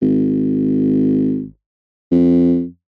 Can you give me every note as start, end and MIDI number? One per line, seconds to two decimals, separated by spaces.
0.02 1.46 32
2.11 2.65 41